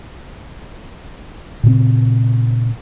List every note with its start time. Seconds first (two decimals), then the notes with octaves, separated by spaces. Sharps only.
1.63 A#2 C#3 C4